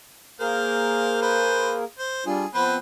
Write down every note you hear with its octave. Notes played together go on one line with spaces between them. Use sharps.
A#3 G#4 A#4 C5 F5
B4 C5
C5
G3 D4 F4 G#4
F3 B3 C4 B4 C5